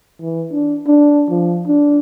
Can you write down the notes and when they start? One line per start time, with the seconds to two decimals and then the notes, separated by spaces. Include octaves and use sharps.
0.21 E3
0.51 D4
0.87 D4
1.29 F3
1.67 D4